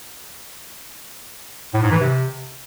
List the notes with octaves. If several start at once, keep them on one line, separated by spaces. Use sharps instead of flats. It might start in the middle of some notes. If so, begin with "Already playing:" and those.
A2
G#2
E3
C3